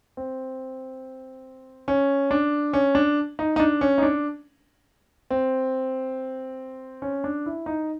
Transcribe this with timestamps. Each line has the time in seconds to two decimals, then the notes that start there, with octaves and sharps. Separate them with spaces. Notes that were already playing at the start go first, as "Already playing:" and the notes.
0.17 C4
1.88 C#4
2.31 D4
2.73 C#4
2.95 D4
3.39 D#4
3.56 D#4
3.60 D4
3.81 C#4
3.98 D#4
4.03 D4
5.31 C4
7.02 C#4
7.24 D4
7.46 E4
7.66 D#4